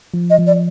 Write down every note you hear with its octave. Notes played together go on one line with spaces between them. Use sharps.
F3
D#5
F3
D5